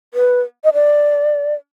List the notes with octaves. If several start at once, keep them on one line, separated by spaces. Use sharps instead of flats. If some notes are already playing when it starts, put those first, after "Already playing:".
B4
D#5
D5